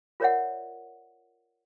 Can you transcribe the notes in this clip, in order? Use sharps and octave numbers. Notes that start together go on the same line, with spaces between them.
F4 A#4 C#5 D5 E5 F#5